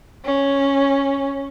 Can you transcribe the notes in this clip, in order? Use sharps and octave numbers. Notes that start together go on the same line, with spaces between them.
C#4